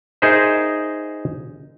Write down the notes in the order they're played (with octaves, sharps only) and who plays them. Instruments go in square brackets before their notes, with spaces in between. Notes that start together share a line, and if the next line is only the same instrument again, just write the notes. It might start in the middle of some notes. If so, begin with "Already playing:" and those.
[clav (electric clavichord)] D#4 G#4 A#4 C5 E5